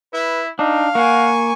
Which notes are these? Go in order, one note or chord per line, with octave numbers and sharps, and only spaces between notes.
E4 B4
D4 D#4 F5
A#3 F#5 G#5 C#6